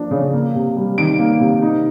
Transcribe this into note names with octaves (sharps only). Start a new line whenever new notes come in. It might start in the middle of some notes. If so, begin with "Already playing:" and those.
Already playing: F3 A#3 D4
C#3
A#3
C3
G3
D#3 D7
A#3
C3
D#4